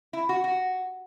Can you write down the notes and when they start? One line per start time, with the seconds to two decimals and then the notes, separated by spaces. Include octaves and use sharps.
0.13 E4
0.29 F#4
0.44 F#4